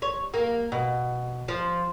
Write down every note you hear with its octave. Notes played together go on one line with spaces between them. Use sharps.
C#5
A#3
B2
F3